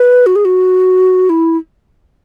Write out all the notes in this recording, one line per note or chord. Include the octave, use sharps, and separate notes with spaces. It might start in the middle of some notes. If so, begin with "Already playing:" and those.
Already playing: B4
F#4
G#4
F#4
E4